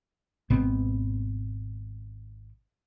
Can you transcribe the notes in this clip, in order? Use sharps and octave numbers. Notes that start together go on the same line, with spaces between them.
G#1 B2 B3 C4